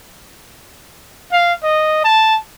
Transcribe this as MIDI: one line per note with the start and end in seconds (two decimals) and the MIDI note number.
1.32 1.53 77
1.63 2.01 75
2.04 2.36 81